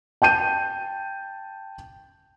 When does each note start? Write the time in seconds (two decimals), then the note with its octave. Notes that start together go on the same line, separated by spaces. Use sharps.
0.22 G5 A5 G6 D#7